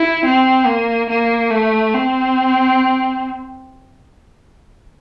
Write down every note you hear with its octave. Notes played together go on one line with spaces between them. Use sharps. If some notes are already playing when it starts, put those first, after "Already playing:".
Already playing: E4
C4
A#3
A#3
A3
C4